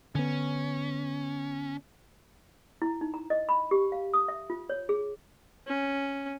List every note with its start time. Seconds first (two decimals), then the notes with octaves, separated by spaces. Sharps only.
0.15 D3 B3 C#4
2.82 E4
3.01 D#4
3.14 A#5
3.30 D#5
3.49 B5
3.71 G4
3.92 F5
4.14 D#6
4.28 E5
4.50 F4
4.70 C#5
4.89 G#4
5.67 C#4